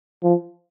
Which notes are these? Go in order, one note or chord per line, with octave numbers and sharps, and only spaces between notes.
F3